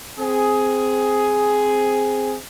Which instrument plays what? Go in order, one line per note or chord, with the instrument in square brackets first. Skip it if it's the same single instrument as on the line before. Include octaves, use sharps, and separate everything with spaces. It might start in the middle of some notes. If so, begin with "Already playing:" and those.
[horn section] C4 G#4